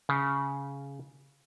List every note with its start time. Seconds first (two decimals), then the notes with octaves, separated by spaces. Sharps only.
0.09 C#3